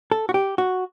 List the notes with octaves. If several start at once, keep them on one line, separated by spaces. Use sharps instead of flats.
A4
F#4
G4
F#4